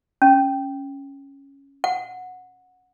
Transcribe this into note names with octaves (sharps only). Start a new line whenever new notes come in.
C#4
F#5